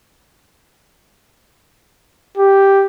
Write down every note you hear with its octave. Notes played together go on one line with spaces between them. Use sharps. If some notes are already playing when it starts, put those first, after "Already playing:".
G4